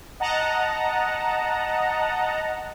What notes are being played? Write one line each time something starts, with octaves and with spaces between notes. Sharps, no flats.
D#5 F#5 A5 A#5